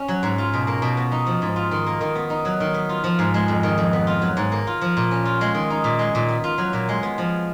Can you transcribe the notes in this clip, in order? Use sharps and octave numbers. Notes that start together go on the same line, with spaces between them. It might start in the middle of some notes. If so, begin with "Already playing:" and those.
Already playing: C#4
F#3
G#2
F4
B2
A#3
B2
B3
D#4
F3
G#2
F4
D#3
A#3
D#3
B3
D#4
F#3
D#3
B3
F4
F3
G#2
G#3
F2
D#3
F2
B3
F4
F#3
G#2
A#3
F4
F3
A#2
C#4
F4
G#3
D#3
D#4
A#2
G#3
A#2
B3
F4
F#3
A#2
G#3
B3
F3